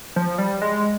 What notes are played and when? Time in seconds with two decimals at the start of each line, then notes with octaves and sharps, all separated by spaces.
0.16 F3
0.38 G3
0.61 G#3